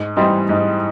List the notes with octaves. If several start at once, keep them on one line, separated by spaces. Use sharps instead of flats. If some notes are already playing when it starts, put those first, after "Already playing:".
Already playing: G#2
E3 G3 C4 D#4
G#2